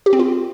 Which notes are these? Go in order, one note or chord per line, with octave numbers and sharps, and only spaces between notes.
G4
C4
F4